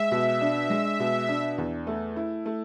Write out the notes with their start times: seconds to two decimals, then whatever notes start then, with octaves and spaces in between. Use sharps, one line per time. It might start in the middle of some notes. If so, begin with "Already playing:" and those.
Already playing: G#3 E5
0.11 B2
0.41 D4
0.70 G#3
1.00 B2
1.29 D4
1.58 E2
1.87 A3
2.16 E4
2.46 A3